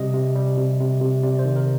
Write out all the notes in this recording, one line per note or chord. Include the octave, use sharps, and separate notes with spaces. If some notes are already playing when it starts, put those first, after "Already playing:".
Already playing: C3 G3 D#5
C3
G3
C3
C3
C3
C3 D5
C5
D#3
A#4